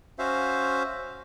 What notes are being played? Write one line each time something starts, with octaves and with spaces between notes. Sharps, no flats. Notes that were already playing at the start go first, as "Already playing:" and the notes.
C#4 F#4 C5 E5 F5